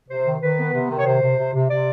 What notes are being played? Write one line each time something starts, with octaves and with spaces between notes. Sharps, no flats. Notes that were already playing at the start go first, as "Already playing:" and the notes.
C3 C5
D#3
D#3 B4
B3
C3
D#3
C#5
C3 C5
C3
C3
C3
C3 D5